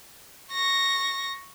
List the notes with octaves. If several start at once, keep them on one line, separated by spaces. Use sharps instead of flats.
C#6 A#6